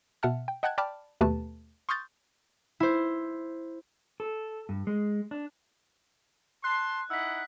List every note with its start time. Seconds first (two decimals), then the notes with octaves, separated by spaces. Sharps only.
0.23 B2 E5 F#5 A5 F6
0.48 G5
0.63 D#5 F#5 G5 A5 F#6 G#6
0.78 D5 G5 A5 B5 D6 F6
1.21 D#2 B2 A3 G4 B4 A5
1.89 C6 C#6 D#6 F6 G6 A6
2.80 E4 C5
4.20 A4
4.69 G2
4.87 G#3
5.31 D4
6.64 A5 C6 F#6
7.10 D#4 E4 F#5 E6 B6